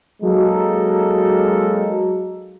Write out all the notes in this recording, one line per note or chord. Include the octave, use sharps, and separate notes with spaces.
F#3 G#3 A#3 D#4 A4